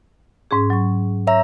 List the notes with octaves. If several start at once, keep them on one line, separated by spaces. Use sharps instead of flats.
G#2 C#4 G#4
F#3 C#6
C#5 E5 A#5